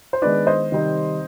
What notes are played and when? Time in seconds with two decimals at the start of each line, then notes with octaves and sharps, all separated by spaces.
0.13 C5
0.22 D#3 G#3 B3 D4 B4 D5
0.47 C5 D#5
0.72 C3 D#3 G3 C4 D#4